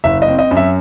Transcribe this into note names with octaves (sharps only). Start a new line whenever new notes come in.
F#1 E5
D#5
C4
D#5
F#2
E5